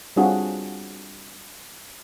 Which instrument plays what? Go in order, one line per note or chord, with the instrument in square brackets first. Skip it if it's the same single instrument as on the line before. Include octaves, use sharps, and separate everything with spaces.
[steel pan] G3 C4 D4 F4 F#4 G#4